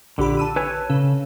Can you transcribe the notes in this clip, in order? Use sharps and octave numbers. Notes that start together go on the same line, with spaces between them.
A#1 D3 G4 B5
A5 E6 D#7
B4 C#5 G#5
C#3 A4